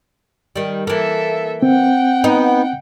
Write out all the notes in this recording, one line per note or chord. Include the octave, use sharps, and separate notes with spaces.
D#3 G3
E3 A#3 A4 E5
C4 F#5 G5
B3 D#4